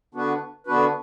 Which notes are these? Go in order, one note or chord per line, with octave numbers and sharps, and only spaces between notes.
D3 B3 D4 F#4 B4
D3 B3 D4 F#4 B4